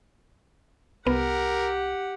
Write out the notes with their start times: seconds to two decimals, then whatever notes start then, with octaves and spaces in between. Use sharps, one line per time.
1.07 C2 B3 G4 A#4 F#5